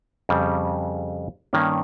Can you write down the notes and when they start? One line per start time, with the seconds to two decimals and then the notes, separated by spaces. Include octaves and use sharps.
0.29 F2 C#3 G3
1.53 G2 D#3 A#3 C#4